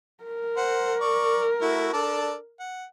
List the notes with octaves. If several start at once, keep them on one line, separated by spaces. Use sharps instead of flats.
A#4
C5 F#5
D5 C#6
A3 E4 F#4
D4 A4 D5
F#5